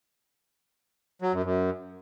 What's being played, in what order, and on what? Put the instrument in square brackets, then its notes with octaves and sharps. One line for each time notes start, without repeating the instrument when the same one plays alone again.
[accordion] F#3
F#2
F#2